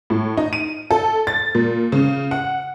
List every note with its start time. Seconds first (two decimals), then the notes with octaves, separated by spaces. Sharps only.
0.10 A2
0.37 D#4
0.53 D#7
0.91 A4
1.27 A6
1.55 A#2
1.92 C#3
2.31 F#5